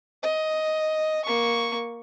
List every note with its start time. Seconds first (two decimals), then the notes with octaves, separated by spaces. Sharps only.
0.22 D#5
1.25 A#3 C#6